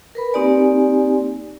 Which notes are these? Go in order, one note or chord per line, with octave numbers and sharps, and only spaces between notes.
A#4 B4 B5
A#3 C4 D#4 G4 D5 G#5